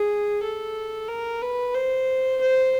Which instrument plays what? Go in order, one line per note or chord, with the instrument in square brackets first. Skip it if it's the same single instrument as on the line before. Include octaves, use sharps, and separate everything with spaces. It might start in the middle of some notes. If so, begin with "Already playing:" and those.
Already playing: [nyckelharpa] G#4
A4
A#4
B4
C5
C5